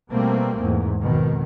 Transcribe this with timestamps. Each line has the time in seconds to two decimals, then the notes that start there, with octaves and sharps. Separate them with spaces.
0.12 B2 G3 A3 A#3 C4
0.60 E2 G#2
1.00 G#1 F2 B2 D#3